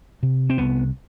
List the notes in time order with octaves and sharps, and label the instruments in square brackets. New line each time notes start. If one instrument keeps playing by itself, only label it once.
[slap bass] C3
C4
C2 B3